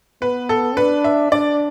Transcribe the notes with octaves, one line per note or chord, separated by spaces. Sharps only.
B3 B4
A4
D4 B4
E5
D4 D5